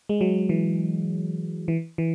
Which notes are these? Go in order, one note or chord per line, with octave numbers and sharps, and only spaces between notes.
G#3
F#3
E3
E3
E3